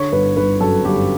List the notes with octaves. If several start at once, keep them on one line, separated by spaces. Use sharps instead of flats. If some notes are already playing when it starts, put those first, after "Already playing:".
Already playing: D3 C#5
G1 B4
G1 B4
F#2 A4
G1 G4